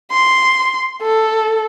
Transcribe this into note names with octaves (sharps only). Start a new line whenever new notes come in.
C6
A4